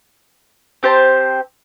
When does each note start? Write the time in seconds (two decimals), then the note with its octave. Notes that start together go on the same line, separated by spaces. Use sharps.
0.83 C4 G4 C5 A5